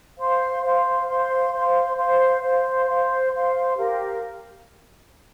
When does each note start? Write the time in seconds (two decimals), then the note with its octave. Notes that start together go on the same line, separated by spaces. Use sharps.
0.17 C5 F5 C6
0.62 C5 F5 C6
1.06 C5 F5 C6
1.52 C5 F5 C6
1.96 C5 F5 C6
2.41 C5 F5 C6
2.86 C5 F5 C6
3.32 C5 F5 C6
3.76 G4 A#4 F5